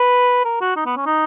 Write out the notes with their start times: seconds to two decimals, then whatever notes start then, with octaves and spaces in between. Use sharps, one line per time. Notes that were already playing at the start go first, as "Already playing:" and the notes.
Already playing: B4
0.45 A#4
0.61 F#4
0.76 D#4
0.86 B3
0.97 C#4
1.06 D#4